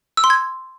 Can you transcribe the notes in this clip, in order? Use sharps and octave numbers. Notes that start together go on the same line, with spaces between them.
E6
C6
G#6